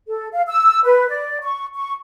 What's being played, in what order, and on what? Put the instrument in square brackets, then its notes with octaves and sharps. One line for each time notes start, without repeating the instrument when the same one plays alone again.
[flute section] A4
F5
E6
B4
D5
C#6
C#6